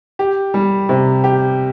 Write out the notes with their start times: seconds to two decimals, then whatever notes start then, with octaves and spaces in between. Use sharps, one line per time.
0.19 G4
0.54 G3
0.89 C3
1.24 G4